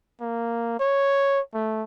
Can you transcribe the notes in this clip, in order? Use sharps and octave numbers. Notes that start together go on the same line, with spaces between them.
A#3
C#5
A3